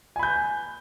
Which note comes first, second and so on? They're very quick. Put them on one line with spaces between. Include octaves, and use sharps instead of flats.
G#5 B5 G6